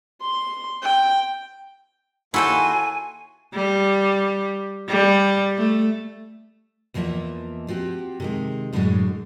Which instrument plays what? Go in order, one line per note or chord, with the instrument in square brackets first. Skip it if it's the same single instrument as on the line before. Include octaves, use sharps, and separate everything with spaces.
[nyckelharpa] C6
G5
[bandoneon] D#2 F#4 C6 [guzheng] E4 A4 G5 [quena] G#5
[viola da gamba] G3
G3
A3
[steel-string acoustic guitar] E2 E3 F3 A#3 D#5 E5
F3 C4 F#4 G4
C3 D#3 G#3
F#2 A2 D3 E3 F#3 G#3